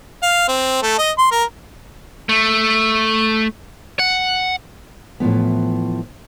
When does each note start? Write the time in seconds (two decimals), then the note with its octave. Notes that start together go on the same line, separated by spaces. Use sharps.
0.23 F5
0.48 C4
0.82 A3
0.99 D#5
1.18 C6
1.31 A#4
2.29 A3
3.99 F#5
5.20 A2 E3 F3 B3